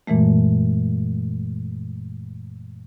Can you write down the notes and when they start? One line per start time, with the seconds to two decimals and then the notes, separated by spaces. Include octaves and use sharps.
0.07 F#2 A#2 E3 G#3 A3